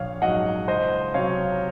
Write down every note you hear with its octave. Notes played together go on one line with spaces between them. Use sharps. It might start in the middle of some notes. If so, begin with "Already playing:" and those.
Already playing: A#1 C#5 F5
G#2 F#3 D#5 F#5
C#2 C5 D#5
C3 F#3 C#5 F5